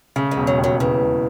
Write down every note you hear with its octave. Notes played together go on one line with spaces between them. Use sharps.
C#3 A3
G#3
E1
F#3
D#2
F#3
C#3 E3
E1